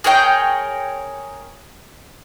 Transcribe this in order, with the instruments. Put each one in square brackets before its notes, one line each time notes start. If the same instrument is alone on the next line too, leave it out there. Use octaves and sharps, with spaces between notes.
[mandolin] G#4 A#4 C#5 G5